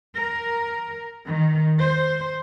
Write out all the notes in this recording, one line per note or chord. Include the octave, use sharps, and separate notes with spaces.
A#4
D#3
C5